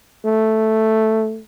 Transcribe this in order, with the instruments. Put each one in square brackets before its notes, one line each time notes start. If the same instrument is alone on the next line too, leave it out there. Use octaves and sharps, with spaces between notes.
[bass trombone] A3